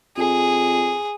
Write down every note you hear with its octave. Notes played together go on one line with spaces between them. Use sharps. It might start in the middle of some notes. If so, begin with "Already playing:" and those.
F2 G#4